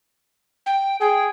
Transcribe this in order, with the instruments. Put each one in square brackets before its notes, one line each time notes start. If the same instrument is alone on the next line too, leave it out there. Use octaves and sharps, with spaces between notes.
[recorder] G5
[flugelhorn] G#4 [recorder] G5